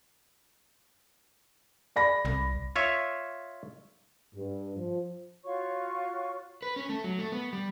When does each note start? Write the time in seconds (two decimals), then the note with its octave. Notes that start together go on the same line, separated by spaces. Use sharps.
1.96 D5 B5 A#6
2.25 C2
2.76 F4 C#5 E5
4.35 G2
4.76 F3
5.44 F4 F#4 C#5 C#6
6.62 B4
6.76 C#4
6.89 A3
7.04 F#3
7.19 A3
7.32 B3
7.53 G3